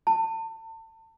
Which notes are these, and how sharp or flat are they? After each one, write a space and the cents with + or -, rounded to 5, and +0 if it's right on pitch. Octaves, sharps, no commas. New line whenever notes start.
A5 +30